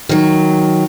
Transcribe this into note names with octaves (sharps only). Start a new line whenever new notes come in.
D#3 F#3